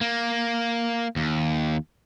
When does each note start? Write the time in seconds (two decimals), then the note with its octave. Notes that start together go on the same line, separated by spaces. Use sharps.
0.01 A#3
1.16 D#2